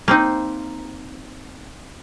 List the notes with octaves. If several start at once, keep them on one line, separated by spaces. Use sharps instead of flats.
A#3 C4 D#4